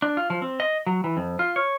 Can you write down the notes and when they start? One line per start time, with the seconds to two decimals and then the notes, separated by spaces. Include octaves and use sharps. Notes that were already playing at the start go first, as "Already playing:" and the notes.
0.02 D4
0.17 F4
0.30 F3
0.42 C4
0.60 D#5
0.86 F#3
1.04 E3
1.17 F2
1.39 F4
1.56 C#5